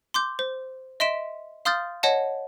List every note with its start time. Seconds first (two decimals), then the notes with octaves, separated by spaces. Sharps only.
0.14 C6 D6 G6
0.39 C5
1.00 D#5 E5 C6 B6 D7 E7
1.65 F5 C6 D#6 F6 G6 A6
2.03 C#5 D#5 F#5 A5